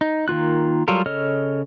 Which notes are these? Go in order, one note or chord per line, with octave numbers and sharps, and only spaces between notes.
D#4
D#3 A#3 F4 F#6
F#3 G3 F4 A4 A#4
C#3 A4 C#5 D#5 F6